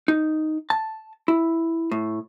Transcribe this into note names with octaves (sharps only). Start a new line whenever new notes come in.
D#4
A5
E4
A2